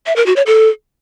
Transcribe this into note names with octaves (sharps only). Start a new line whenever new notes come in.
E5
A#4
F#4
C#5
A4